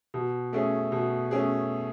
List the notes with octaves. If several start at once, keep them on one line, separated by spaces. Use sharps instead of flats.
B2
A3 C#4 G#4
B2
A3 C#4 G#4